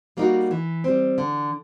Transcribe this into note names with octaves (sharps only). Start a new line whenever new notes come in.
G3 A#3 D#4 F#4
E3
G3 C4
D3